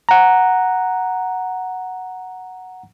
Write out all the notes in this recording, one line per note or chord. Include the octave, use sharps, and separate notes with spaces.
F#5 A#5